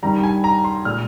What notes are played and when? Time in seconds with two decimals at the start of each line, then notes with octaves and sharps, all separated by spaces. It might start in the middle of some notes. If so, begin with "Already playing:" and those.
0.03 G2 D#3 G3 A#5
0.23 G#5
0.44 A#5
0.64 C6
0.85 A#2 G#3 F6